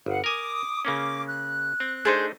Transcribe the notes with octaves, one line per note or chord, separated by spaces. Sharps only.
G1 F5 F#5
A#4 G#5 D6 D#6
C#3 A#3 C#4 D6
F#6
C4
A3 D4 D#4 G#4 C5